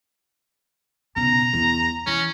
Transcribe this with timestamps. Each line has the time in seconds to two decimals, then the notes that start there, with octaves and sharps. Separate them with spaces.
1.16 B1 C#3 A#5
1.53 E2
2.07 E3 C#4